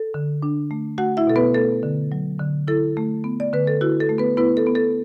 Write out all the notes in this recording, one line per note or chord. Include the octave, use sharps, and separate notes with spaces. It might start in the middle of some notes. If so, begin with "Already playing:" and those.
Already playing: A4
D3
D4
A3
A3 F#4 F#5
E4 E5
B2 A4
B3 B4
A3 A4
D3
F#3
D3
E4 A4
A3
B3
D5
D3 B4
A4
E4 F#4
A4
A3
B3 B4
B3 E4 B4
A4
B3
A4